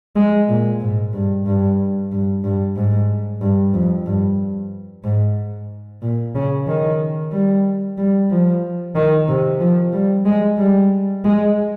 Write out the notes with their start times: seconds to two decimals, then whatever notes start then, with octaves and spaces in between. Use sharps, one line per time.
0.16 G#3
0.48 A#2
0.80 G#2
1.13 G2
1.46 G2
2.12 G2
2.44 G2
2.76 G#2
3.41 G2
3.74 F2
4.06 G2
5.04 G#2
6.02 A#2
6.35 C#3
6.67 D#3
7.32 G3
7.98 G3
8.30 F3
8.95 D#3
9.28 C3
9.60 F3
9.93 G3
10.25 G#3
10.58 G3
11.24 G#3